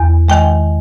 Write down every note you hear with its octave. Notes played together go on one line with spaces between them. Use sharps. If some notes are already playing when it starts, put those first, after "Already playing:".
Already playing: E2
D#3 G#3 G5